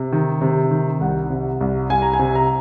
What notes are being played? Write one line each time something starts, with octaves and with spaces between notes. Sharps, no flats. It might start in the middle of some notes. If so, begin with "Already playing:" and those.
Already playing: C3
D#3
C3
D#3
C2 F#5
C3
C2
C2 G#5
A#5
G#5
C3
A#5